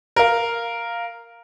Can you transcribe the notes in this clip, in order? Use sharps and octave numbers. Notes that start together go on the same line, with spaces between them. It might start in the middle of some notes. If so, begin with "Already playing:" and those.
A#4 F5